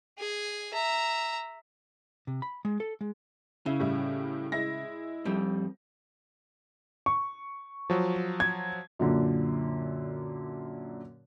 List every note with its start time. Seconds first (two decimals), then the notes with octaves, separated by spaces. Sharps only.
0.18 G#4 G#5
0.74 E5 A#5
2.27 C3
2.42 B5
2.65 G#3
2.80 A4
3.01 G#3
3.66 C#3 E4
3.80 A2 G3 E4
4.52 G#3 E4 A#6
5.25 F2 G3
7.06 C#6
7.90 F3 F#3
8.40 G#6
8.99 F#2 A#2 D3